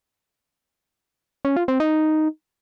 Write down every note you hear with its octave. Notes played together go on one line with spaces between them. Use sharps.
C#4
F4
C4
D#4